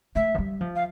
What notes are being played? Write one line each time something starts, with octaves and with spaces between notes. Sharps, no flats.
A3 E5
F3
G3
F3
F5